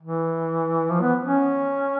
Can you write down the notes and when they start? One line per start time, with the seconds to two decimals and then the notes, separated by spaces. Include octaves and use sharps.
0.02 E3
0.91 F3
1.01 B3
1.24 C#4